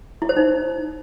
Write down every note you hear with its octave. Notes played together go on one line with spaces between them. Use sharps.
E4
C5
D#4